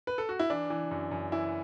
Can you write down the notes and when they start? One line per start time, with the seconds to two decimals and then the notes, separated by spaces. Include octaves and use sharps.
0.07 B4
0.18 A4
0.29 F#4
0.39 E4
0.50 E3 D4
0.70 E3
0.91 F#2
1.11 F#2
1.32 E3 E4